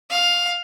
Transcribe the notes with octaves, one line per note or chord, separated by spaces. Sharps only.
F5